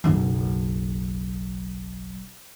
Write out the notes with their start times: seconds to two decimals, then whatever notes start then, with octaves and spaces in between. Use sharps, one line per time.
0.04 F#1 B1